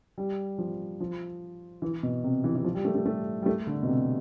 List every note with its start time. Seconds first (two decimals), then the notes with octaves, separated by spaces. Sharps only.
0.18 G3
0.58 F3
1.00 F3
1.82 E3
2.03 B2
2.24 C3
2.44 E3
2.55 E3
2.64 F3
2.75 G3
2.85 A3
2.95 A3
3.06 A3
3.42 G3
3.46 A3
3.67 D3
3.83 B2
3.87 C3